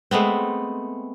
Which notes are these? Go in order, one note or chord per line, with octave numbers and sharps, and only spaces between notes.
G#3 A3 B3 C4